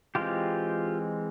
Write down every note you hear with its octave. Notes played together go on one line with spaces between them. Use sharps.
E3 G#3 C4 F4 G4